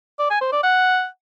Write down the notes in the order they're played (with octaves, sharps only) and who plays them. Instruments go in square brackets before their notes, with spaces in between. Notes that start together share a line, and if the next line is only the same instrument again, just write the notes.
[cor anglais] D5
G#5
C5
D5
F#5